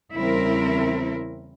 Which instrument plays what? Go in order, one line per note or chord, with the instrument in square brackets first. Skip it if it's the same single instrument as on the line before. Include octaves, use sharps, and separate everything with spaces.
[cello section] E2 C#3 G3 C4 E4 A#4